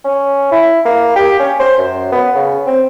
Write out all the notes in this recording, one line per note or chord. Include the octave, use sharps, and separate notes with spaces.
C#4
E4
A#3
G4
C#4
C5
F#2
B3
C#3
C4